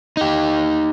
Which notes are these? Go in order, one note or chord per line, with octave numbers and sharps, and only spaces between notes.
D#4 G4